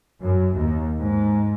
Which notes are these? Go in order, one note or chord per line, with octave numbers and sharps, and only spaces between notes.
F#2
D#2
G#2